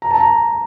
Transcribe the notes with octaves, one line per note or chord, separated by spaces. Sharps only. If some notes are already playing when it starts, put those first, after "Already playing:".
A#5
A5
A#5